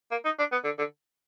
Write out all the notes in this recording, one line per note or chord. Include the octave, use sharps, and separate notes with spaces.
A#3
D#4
D4
B3
D3
D3